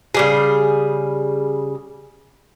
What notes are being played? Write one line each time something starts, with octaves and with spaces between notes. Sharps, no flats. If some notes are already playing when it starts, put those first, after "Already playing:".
C#3 G3 G#4